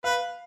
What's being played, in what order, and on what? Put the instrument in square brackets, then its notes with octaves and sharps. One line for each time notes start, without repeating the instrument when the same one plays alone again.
[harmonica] B4 [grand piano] F5